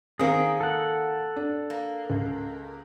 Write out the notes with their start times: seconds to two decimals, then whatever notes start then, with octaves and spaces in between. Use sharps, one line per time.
0.19 D#3 A#3 C4 D#4 G#4
0.61 A4 F#5
1.36 D4
1.70 A#3
2.10 C#2